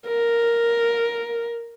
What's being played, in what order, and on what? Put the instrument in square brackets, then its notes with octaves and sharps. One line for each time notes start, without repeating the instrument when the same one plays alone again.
[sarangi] A#4